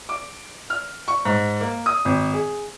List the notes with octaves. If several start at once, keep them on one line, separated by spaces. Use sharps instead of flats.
D6
F6
C#6
G#2
A#3
D#6
G#1
G#4